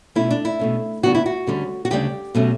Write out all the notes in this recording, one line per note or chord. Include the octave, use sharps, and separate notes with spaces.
B2 A3 C#4 E4
D4
E4
B2 A3 C#4
C#3 F#3 B3 D4 F#4
E4
F#4
D2 D3 G3 C#4
F#4
D2 C#3 G3 D4 G4
B2 F#3 A3 C#4